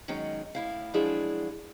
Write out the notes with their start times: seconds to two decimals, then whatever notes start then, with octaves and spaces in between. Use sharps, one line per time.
0.08 D#3 F#3 G#3 C#4 D#4
0.55 A2 E4 F5
0.94 F3 F#3 G#3 D4 E4 G#4